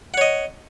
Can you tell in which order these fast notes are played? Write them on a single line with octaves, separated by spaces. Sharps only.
F#5 C#5 D#5